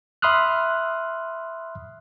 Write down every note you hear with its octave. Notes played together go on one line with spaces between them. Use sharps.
E5 B5 C6 D#6 F6 F#6